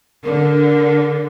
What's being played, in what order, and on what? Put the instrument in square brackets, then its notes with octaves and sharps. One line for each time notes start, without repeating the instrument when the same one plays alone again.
[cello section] D3 [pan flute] A#4